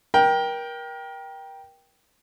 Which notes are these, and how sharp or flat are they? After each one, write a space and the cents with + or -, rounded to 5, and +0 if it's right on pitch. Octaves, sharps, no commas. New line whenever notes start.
A#4 +30 G5 +0